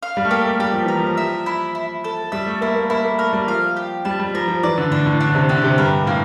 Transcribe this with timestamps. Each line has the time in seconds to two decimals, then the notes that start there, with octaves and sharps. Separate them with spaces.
0.03 F5
0.17 G3
0.25 A3
0.31 A#3 G4
0.45 A3
0.60 G3 G4
0.73 F3
0.85 E3 A#4
0.98 F3
1.17 E5
1.46 E4
1.75 E4
2.04 A4
2.32 G3 E5
2.46 A3
2.61 A#3 E4
2.76 A#3
2.90 A#3 E4
3.05 A#3
3.19 A3 A#4
3.33 G3
3.47 F3 F5
3.76 G4
4.05 G3 A5
4.19 G3
4.34 F3 A#4
4.48 F3
4.63 E3 D5
4.78 D3
4.91 A2 D4
5.06 A2
5.20 D4
5.27 D3
5.35 C3
5.49 D3 G4
5.64 C3
5.78 G2 A#4
6.07 A2 A#3